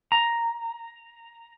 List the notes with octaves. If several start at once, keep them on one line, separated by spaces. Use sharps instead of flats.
A#5